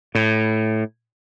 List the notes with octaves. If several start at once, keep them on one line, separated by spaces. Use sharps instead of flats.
A2